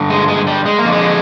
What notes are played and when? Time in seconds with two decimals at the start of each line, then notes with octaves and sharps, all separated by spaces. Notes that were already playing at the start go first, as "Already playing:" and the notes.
Already playing: G2 D3
0.10 G#3
0.28 G#3
0.47 G3
0.66 G#3
0.78 A#3
0.85 F2 D3
0.92 G#3